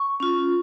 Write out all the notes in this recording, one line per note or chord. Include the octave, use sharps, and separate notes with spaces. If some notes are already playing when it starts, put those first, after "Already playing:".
Already playing: C#6
C#4 F4